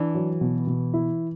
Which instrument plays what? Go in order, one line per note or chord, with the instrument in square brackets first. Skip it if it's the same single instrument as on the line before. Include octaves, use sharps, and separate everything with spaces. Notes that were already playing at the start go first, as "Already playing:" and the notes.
Already playing: [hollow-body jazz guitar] E3 [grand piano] D4
[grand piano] F#3
B2
B2
E4